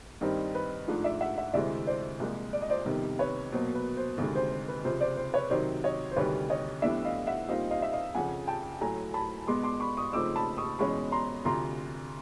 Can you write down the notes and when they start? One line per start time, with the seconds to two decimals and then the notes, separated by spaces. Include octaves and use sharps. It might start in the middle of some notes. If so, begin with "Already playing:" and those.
0.21 G2 D#3 G3 C4 D#4
0.55 B4
0.88 G#2 F3 A3 D4
1.04 D5 E5
1.21 E5 F#5
1.37 E5 F#5
1.53 D2 C3 E3 G#3 C4 D5 E5
1.87 C5 D5
2.20 C2 A#2 F3 G#3
2.53 D5
2.62 D#5
2.70 C5 D5
2.86 F2 C3 D#3 G3 B3
3.19 B4 C#5
3.52 B2 F#3 A#3 C5
3.75 B4
3.97 C5
4.18 D2 C3 D#3 G#3
4.35 C5
4.51 C5
4.68 B4
4.84 C#2 C3 F3 C5
5.00 C5 D5
5.17 C5
5.33 B4 C#5
5.50 C3 D#3 F#3 C5 D5
5.84 C#5 D#5
6.11 C5
6.16 D2 C3 D#3 G3 B4 C#5
6.50 C#5 D#5
6.82 A2 E3 G3 B3 D4 D5 E5
7.04 D#5 F5
7.27 E5 F#5
7.48 A#2 G3 C4 D#4 D#5 F5
7.71 D#5 F5
7.82 E5
7.92 D#5 F5
8.15 F2 C#3 F3 F#5 G#5
8.47 G5 A5
8.81 A2 F#3 A3 G#5 A#5
9.14 A5 B5
9.47 B2 G#3 B3 C6 D6
9.63 C6 D6
9.80 B5 C#6
9.97 C#6 D#6
10.13 C#3 F3 A3 C4 D#4 D6 E6
10.36 A5 B5
10.57 C#6 D#6
10.79 E2 B2 G#3 C#4 B5 C#6
11.12 A#5 C6
11.45 D2 C3 F3 A#5 C6